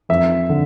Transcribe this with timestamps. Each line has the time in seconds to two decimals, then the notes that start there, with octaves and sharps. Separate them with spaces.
0.09 F2 E5
0.49 D3